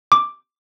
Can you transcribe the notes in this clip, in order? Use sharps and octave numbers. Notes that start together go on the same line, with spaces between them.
D6